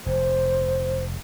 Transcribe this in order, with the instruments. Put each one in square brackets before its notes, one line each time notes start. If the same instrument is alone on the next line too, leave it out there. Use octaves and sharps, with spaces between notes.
[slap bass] F1 [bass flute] C5